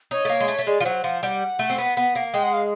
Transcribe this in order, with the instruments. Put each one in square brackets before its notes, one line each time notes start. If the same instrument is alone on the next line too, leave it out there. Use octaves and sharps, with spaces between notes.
[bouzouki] D#4 [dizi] C#5
[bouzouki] A3
A#3
G#3
A3
A3
[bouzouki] G#3 [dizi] D5
[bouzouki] F3
[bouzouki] F#3 [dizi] C5
[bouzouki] F3 [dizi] F#5
[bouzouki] G3 [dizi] F#5
[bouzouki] A3
C4
B3
B3
A#3
[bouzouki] G#3 [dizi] G5
[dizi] F#5
F5